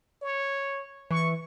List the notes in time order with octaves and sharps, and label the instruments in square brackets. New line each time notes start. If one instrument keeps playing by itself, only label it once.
[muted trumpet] C#5
[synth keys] E3 [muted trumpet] C#6